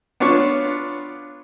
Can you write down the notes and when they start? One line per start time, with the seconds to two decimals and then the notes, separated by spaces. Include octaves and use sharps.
0.20 B3 D4 F4 C#5